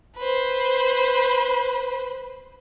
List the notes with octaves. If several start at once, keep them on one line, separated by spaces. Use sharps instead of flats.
B4 C5